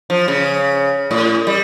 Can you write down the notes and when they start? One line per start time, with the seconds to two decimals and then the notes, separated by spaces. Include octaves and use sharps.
0.10 F3
0.28 C#3
1.11 A2
1.47 G3